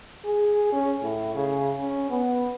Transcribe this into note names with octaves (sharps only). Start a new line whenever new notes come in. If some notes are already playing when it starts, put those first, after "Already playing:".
G#4
C#4
A2
C#3
C#4
B3